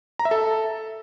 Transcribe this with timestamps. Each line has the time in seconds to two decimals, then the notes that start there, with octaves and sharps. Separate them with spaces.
0.19 A#5
0.25 E5
0.31 A4